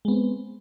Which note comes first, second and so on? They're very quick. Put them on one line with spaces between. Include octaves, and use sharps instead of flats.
G#3 B3 C4